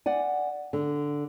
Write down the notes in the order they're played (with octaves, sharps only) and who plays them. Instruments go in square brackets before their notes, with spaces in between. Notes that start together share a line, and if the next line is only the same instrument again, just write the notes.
[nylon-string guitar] D5 F#5 G#5
D3